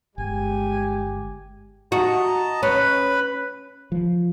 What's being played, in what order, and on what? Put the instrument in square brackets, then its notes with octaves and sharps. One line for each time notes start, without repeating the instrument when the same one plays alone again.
[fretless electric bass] G1 [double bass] G#3 [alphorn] G4 [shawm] G#5
[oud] F#4 [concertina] D#5 A5 A#5
[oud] C#4 [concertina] B4 B5
[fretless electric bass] F3